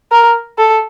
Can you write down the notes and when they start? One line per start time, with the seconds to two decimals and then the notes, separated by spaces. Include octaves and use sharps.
0.12 A#4
0.59 A4